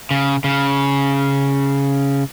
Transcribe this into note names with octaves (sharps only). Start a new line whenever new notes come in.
C#3
C#3